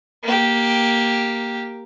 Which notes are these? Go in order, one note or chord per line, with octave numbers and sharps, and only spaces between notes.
A#3 G4